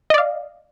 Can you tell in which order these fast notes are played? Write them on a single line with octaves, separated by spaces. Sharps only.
D#5 D5 F5